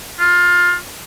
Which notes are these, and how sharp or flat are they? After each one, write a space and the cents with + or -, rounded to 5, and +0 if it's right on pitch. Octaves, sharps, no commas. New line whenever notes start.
F4 +20